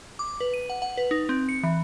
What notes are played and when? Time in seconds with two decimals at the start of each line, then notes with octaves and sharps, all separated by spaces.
0.19 D6
0.40 B4
0.54 D#7
0.70 F#5
0.82 F#5
0.97 B4
1.11 D#4
1.29 C4
1.49 C#7
1.63 E3